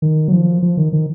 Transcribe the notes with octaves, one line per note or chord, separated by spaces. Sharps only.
D#3
F#3
F3
F3
D#3
D#3